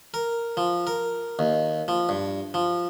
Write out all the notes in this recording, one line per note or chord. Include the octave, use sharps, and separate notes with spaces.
A#4
F3
A#4
D#2
F3
G2
F3